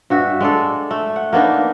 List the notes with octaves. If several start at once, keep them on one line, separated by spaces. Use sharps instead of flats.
G2 F#4 E5
G#3 D4 A4
A3
F#5
A#3 B3 D4 D#4